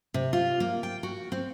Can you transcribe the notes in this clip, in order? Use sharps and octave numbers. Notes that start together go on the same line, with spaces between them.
C3
F4
A#3
G5
F#4
C4